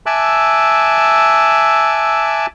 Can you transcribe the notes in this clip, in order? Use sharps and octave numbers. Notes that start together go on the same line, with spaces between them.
E5 G#5 A5 D6 E6 F#6